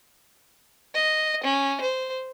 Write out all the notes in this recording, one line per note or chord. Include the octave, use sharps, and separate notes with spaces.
D#5
C#4
C5